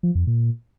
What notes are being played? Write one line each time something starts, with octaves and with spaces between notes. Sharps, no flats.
F3
F2
A#2